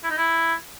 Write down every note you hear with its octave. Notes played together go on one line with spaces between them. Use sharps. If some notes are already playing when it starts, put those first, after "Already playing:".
E4
D#4
E4